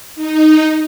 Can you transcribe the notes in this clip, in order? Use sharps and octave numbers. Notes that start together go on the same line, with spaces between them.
D#4